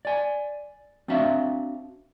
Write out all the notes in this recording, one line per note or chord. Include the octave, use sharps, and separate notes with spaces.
D5 G#5
C4 D4 F#4 E5 F5